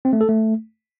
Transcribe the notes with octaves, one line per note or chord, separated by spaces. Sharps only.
C4
A3
A4
A3